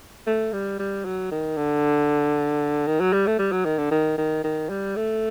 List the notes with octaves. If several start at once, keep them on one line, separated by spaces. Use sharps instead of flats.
A3
G3
G3
F#3
D#3
D3
D#3
F#3
G3
A3
G3
F#3
D#3
D3
D#3
D#3
D#3
G3
A3